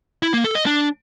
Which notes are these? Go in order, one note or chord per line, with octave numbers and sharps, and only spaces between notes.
E4
A#3
A4
D#5
D4